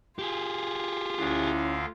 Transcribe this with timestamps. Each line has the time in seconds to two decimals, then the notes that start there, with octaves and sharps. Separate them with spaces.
0.19 F4 G4 G#4
1.18 D2 D3 C#4 E4 F5